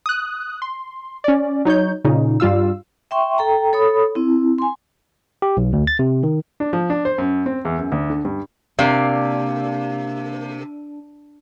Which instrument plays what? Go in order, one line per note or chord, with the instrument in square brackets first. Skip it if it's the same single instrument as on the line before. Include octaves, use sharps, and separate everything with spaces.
[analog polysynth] D#6 F#6
C6
C#4 D5
F#3 D#4 C#5 G6
A#2 C#3 D#4
G2 G3 F4 F5 E6
[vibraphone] E5 G5 C6 C#6
A4 G5 A#5
A4 C#5 B5 D#6
C4 E4
G#5 C6
[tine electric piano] G4
B1
D2
A6
C3
D#3
[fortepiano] D4
F3
D4
C5
F#2
C4
E2
F#2
D2
D3
G2
[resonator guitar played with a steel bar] C3 [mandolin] A#3 D5 F5 [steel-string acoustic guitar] D4